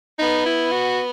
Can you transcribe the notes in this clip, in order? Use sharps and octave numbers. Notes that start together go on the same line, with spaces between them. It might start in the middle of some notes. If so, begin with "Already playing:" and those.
B3 D#4
E4
F#4